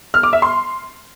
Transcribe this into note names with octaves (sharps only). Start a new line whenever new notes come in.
F6
D6
E5
C6